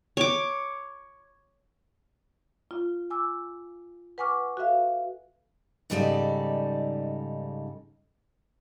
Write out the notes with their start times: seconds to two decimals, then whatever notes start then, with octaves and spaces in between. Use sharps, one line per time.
0.17 C#5 D6
2.71 F4
3.10 G#5 D6 E6
4.18 B4 F#5 G#5 C#6 D6 F6
4.57 F#4 A4 B4 E5 F5
5.90 G#2 C#3 G3 D#4 A4 D5